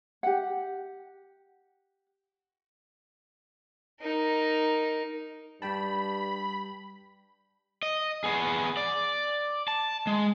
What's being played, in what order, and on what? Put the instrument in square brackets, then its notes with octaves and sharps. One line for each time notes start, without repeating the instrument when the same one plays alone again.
[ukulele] G4 F#5
[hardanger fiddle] D#4 A#4
[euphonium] G2 [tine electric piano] G3 G5 A5 [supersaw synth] B5
[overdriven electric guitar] D#5
B3 G#4
D5
A5
G#3